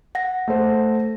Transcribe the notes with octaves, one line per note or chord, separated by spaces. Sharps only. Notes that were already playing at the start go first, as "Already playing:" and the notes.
F#5 A#6
A3 C5